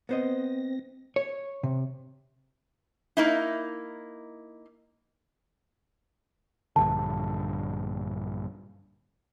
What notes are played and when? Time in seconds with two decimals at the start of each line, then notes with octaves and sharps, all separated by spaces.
0.09 B3 C4 C5 D#5 A#6
1.16 C#5
1.63 C3
3.17 A#3 D#4 E4
6.76 A#1 G2 D3 A5